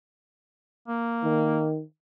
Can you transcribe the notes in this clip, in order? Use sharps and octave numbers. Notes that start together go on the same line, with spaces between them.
A#3
D#3